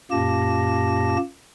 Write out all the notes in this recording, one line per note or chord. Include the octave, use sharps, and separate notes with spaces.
F#2 A#2 A#3 G4 A5 A#6